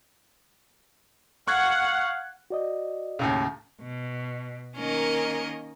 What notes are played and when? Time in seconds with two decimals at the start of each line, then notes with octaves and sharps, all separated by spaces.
1.48 F5 F#5 C#6 F#6 G#6
2.50 F#4 D5 D#5
3.19 D#2 A2 C#3
3.81 B2
4.75 D#3 A#3 C#4 A#4 D#5